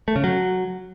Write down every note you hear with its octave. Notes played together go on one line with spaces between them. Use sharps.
A3
C#3
F#3